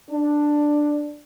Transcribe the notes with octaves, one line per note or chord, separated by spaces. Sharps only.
D4